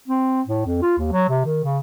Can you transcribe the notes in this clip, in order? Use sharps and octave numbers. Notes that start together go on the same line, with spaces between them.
C4
A2
F2
F4
D#2
F#3
C3
D#3
C#3